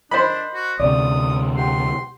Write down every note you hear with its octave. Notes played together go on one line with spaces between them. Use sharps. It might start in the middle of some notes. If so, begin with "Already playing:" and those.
D4 A#4 C5 D#5 B5
F#4
D2 C3 C#4 D5 D#6
G4 F#5 C6